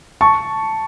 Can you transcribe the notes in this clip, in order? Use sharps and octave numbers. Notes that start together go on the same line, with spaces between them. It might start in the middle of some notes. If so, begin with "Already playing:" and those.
A5 C#6